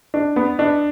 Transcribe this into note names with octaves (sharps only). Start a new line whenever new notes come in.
D4
B3
D4